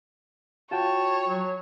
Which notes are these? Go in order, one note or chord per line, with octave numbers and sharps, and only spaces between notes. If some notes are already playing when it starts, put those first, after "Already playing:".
F4 F#4 C#5 G5 A5
F#3